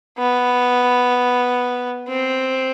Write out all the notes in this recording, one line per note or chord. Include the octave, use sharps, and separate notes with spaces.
B3
C4